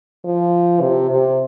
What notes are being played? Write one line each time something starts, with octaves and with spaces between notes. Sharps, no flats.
F3
C3
C3